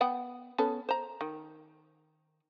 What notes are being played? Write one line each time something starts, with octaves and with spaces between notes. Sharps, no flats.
B3 F#5 G5
B3 C#4 A4
C5 A#5
D#3